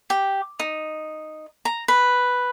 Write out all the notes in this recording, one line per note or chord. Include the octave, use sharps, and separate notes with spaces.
G4
D#4
A#5
B4